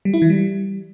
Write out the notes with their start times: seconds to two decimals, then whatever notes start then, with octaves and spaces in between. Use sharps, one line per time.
0.05 G3
0.14 E4
0.22 E3
0.30 G3